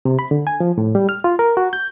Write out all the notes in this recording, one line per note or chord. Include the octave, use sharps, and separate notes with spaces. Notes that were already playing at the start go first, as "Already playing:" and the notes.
C3
B5
D3
G#5
F3
A2
G3
F6
F4
A#4
F#4
G6